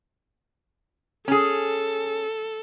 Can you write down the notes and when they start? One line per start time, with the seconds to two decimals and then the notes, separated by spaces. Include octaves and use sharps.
1.28 C#4 G#4 A4